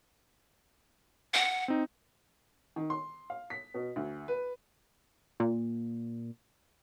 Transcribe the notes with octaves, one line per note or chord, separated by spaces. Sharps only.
F#5
C4 D#4
D#3
C6
F5
B6
B2
D2
B4
A#2